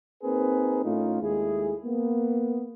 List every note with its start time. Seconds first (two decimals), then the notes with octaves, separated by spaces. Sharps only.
0.23 A#3 C4 D#4 G#4 A#4 B4
0.84 A2 A3 C#4 D#4 F4
1.22 D#2 G#3 A3 E4 G#4
1.85 A#3 B3